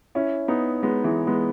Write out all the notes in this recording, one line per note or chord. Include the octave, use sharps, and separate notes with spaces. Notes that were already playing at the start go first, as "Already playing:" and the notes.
C#4 E4
B3 D#4
G#3 B3
E3 G#3
G#3 B3